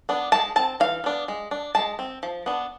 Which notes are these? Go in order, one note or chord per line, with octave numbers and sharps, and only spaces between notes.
B3 D4
G#3 A5
C4 A5
E3 F5
B3 D4
G#3
D4
G#3 A5
C4
F3
B3 D4